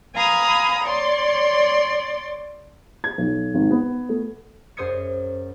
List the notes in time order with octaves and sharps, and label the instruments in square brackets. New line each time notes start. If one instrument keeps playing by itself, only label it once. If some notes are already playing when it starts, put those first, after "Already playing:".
[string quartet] F5 G#5 A#5 B5 D#6
C#5 D5 C6
[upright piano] G#6
B1
G#1
B3
A3
[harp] F#2 G#4 C5 D#6 G#6 C#7